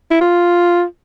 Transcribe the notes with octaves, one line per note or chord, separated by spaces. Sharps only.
E4
F4